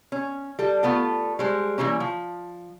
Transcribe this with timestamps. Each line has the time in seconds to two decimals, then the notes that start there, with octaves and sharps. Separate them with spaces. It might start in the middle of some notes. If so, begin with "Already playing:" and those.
0.12 C#4
0.59 G3 A4
0.83 A3 B3 F4 A4
1.39 G3 G#3 C5
1.78 E3 F3 G3 A#3 C#4
2.00 F3